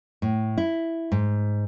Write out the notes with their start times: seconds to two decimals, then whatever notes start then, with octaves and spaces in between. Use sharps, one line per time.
0.22 A2
0.58 E4
1.12 G#2